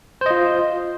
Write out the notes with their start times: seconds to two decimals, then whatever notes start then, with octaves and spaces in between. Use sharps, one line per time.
0.21 C5
0.26 D#5
0.31 F4